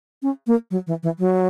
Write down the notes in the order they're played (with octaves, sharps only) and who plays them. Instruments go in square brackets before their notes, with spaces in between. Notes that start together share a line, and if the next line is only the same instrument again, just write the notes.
[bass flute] C#4
A#3
F#3
E3
E3
F#3